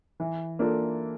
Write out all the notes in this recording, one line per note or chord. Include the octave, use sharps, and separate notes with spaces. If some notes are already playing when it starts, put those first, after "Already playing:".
E3
A#3 D4 F4 A4